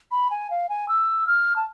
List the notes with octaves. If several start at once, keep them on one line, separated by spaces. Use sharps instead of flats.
B5
G#5
F5
G#5
E6
F6
A5